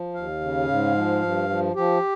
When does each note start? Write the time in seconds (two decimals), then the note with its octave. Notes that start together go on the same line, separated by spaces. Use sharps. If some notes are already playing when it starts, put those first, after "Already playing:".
Already playing: F3
0.14 D#2 F5
0.41 C#3
0.68 G#2
0.95 F3
1.22 G2
1.49 F3
1.75 F3 G4